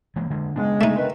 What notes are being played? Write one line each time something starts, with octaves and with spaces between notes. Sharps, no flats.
E3 G#3 A#3
D3 G#3
C#3 G#3 B3 D4
A3 D#4
D#3 B4